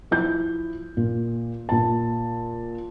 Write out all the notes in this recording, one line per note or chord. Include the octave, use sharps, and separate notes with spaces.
F3 E4 G6
A#2
A#2 A5